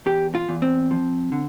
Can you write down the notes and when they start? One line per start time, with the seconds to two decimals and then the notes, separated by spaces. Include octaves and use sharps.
0.06 E2 G4
0.35 F4
0.49 E2
0.62 C4
0.91 F3
1.32 D3